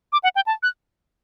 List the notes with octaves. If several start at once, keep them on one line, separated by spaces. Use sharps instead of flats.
D6
F#5
G5
A5
F#6